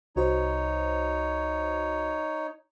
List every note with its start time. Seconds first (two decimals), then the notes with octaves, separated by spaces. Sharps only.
0.16 C2 D#4 F#4 C5 C#5